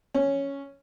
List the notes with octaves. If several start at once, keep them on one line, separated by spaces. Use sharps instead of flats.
C#4